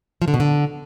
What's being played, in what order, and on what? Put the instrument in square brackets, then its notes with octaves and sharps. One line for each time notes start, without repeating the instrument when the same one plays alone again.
[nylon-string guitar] F3
D3
B2
D3